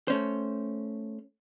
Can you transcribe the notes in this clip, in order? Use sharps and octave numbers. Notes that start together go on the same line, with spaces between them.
A3 C#4 C5